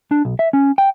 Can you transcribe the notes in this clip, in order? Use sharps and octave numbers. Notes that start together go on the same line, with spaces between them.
D4
B1
E5
C#4
G5